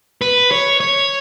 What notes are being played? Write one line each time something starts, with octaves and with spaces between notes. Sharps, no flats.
B4
C#5
C#5